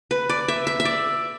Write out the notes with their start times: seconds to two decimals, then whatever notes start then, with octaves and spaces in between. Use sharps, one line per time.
0.11 B4
0.29 D5
0.48 E5
0.67 E5
0.80 E5
0.85 D5